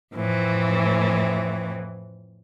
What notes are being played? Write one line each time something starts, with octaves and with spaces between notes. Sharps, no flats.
F2 A2 E3 C4